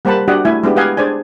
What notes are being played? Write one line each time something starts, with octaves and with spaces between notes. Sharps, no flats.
G3 A#3 C5 F#5 A5 B5
D4 F#4 G4 D#5 F#5
A3 E4 E5 G#5
G#3 B3 D4 G4
G4 B4 D#5 F5 F#5 G#5
D4 G#4 C5 D5 G#5